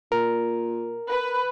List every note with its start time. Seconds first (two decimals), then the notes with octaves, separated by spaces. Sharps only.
0.12 A#2 A#4
1.10 B4